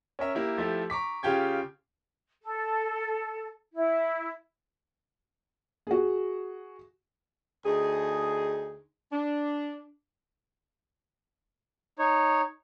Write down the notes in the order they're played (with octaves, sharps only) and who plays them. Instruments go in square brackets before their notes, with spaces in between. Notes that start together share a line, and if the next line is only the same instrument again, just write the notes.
[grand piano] C#4 A#4 E5
A#3 E4 G4
F3 A3 E4 G4
A#5 C#6 D6 B6
C#3 F4 G4 G5 G#6
[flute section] A4
E4
[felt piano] F#4 G#4
[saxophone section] D2 D#4 G#4
D4
[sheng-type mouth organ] D#4 C#5